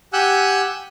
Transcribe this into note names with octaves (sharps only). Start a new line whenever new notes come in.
G4 F#5 G#5 E6 F#6 G6